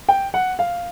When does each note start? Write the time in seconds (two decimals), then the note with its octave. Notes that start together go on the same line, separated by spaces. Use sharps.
0.09 G5
0.34 F#5
0.59 F5